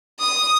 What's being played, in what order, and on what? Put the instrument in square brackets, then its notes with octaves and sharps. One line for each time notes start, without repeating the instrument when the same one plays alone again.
[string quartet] D#6